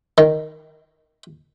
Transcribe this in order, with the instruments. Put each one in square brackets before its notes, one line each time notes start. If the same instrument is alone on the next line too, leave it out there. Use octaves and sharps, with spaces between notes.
[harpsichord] D#3